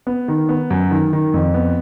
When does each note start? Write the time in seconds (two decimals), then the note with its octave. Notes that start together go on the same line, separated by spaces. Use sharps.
0.07 B3
0.28 D#3
0.49 B3
0.70 F#2
0.91 D#3
1.13 D#3
1.34 F2
1.54 B3